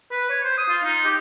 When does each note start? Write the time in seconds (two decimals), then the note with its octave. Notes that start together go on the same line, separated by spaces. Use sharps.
0.11 B4
0.30 C#5
0.44 C5
0.57 D#6
0.69 F4
0.84 D#4
1.05 G4